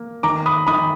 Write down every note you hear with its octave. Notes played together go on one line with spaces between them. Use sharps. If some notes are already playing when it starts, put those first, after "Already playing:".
Already playing: A#3
D#3 A#5 D6
B5 D#6
D#3 B5 D#6